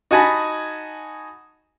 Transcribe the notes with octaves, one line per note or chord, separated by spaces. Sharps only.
D#4 F#4 F#5 G#5 A5 B5